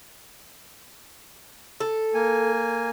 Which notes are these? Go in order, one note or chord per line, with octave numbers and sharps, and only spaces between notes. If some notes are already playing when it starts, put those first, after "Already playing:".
A4
A#3 G#5